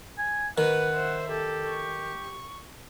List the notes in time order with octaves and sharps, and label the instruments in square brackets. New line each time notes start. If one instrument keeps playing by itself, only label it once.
[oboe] G#5
[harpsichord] D#3 [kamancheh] B4 [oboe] F#5
[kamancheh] C5 E5
[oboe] G4 [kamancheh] A4
[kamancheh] C#6